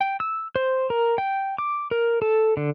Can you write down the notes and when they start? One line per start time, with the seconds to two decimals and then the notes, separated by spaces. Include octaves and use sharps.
0.01 G5
0.20 E6
0.56 C5
0.90 A#4
1.18 G5
1.58 D6
1.91 A#4
2.22 A4
2.57 D3